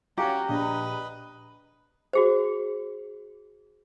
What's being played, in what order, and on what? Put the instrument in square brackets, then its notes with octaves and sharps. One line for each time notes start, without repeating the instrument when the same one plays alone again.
[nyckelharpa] C#4 F#4 [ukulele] G4 [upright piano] F5 G#5 [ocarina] A#5
[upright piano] A#1 [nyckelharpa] B4 D#5
[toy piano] F#4 G#4 C5